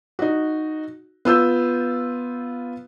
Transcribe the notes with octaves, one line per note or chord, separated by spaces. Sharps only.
D#4 F#4
B3 F4 E6 G6